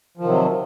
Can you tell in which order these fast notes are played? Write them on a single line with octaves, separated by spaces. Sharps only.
F3 D#3 C3 F#3